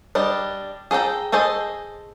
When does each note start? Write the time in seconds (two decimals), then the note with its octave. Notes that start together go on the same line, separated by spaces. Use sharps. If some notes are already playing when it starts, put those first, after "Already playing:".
0.15 G3 D4 D#5
0.91 G#4 A4 F#5 G5 A#5
1.32 G#4 A4 C5 D#5 G#5